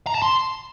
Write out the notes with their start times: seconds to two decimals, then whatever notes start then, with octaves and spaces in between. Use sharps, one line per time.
0.07 A#5
0.15 A5
0.22 C6